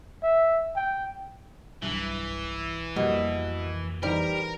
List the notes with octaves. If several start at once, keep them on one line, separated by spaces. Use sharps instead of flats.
E5
G5
B1 G2 E3
F2 B2 G3 A#3 F#4
E3 G3 D#4 A#4 C5 A#5